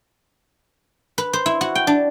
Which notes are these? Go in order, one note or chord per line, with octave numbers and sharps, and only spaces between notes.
B4
C5
E4
F#4
G5
D4